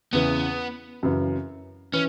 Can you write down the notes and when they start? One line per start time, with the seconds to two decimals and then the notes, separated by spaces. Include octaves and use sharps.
0.13 E2 C#3 E3 B3
1.03 F#2 C#3 E3
1.93 E3 C#4